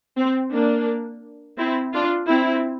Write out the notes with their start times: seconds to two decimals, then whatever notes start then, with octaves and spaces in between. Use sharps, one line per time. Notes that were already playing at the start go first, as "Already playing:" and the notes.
0.17 C4
0.53 A#3 D4
1.58 C4 E4
1.93 D4 F4
2.28 C4 E4